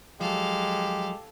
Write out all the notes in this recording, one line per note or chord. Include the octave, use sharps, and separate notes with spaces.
F3 F#3 G#3 G4 A4 F5